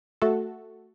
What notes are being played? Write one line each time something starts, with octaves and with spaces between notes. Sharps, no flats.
A3 F#4 A4